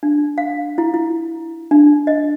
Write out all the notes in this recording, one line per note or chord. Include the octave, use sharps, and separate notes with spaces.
D4
F5
E4
E4
D4
D#5